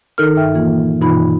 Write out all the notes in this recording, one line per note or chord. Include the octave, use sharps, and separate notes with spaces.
D#3 D#4 A4 A#4 F6
G2 A#4 E5 G5 F6
A#2 E3 A#3 F4
G2 B2 E3 D#4 F4 B5